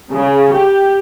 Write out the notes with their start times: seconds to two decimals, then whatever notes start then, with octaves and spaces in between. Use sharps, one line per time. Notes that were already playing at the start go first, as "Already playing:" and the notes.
0.13 C#3
0.53 G4